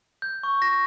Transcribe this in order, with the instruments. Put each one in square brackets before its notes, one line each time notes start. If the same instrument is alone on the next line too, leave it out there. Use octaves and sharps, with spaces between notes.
[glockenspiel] G6
C#6
A#6